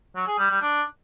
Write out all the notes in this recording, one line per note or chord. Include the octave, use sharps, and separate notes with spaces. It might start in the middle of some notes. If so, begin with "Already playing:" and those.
F#3
G#4
G3
G3
D4